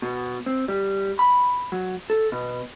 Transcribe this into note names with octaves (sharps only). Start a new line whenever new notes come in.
B2
C4
G3
B5
F#3
A4
B2